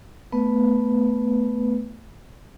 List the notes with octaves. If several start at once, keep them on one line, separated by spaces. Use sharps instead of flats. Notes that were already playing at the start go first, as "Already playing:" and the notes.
A3 B3 B4